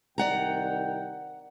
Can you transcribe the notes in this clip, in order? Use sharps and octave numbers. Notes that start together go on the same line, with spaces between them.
C2 D#3 D5 F#5 G5 A#5